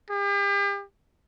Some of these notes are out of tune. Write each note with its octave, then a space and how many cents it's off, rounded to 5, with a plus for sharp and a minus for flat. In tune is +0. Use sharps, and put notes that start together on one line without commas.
G4 +40